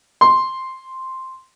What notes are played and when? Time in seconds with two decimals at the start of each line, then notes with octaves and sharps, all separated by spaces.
0.21 C6